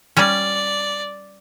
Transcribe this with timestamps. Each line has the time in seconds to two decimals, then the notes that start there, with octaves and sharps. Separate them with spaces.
0.17 G3 C#4 D5